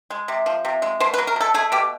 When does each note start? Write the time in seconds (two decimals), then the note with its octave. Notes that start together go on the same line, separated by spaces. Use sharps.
0.10 G#3
0.28 C3
0.46 F3
0.65 C3
0.82 G#3
1.00 B2 C5
1.14 B4
1.18 F#3
1.27 A#4
1.36 B2 A4
1.54 A3 G#4
1.72 B2 G4